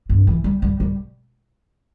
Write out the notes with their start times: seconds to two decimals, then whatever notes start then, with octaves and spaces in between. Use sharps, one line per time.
0.09 G2
0.27 E3
0.44 G3
0.62 G3
0.80 G3